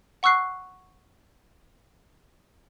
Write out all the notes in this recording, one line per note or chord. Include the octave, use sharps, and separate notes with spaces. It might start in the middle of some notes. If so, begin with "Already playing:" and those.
F#5 C#6 E6 F#6 C7